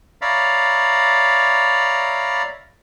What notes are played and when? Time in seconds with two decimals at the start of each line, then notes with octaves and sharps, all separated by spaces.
0.22 C#5 D5 E5 F5 A#5 B5